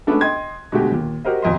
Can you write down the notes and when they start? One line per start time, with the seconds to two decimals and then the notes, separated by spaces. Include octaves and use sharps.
0.07 G#3 A3 B3 C#4 D4 A4
0.21 D#5 G5 C6 G#6
0.72 B2 D3 G#3 A3 F#4 G4
0.92 D#2 A#2
1.25 F#4 G4 A#4 C5 D#5
1.42 D#1 B1 F2 D#5 C6